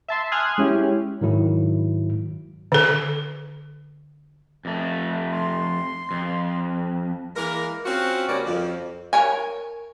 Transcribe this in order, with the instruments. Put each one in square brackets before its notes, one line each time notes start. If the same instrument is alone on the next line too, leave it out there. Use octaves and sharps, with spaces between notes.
[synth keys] E5 A5 C6
G#5 C6 D#6 F6 F#6 G#6
G#3 C#4 E4 G4
[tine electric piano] G#2 D#3 F#3 E4
[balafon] D3 A4
[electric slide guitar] F2 A3
[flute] C6
[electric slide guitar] F2
[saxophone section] E3 G#3 A#3 A#4
C4 C#4 F4 F#4
G2 C#3 F#3 A#3 C#4 D5
F2
[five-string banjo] A#4 C#5 G#5